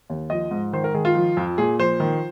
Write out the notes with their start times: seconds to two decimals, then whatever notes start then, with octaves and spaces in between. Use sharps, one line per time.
0.10 D#2
0.30 F3 D#5
0.51 G#2
0.73 D#3 C5
0.84 A#4
0.94 D#3 G#4
1.05 F4
1.15 F3
1.37 F2
1.58 A#2 G#4
1.79 F3 C5
2.00 D#3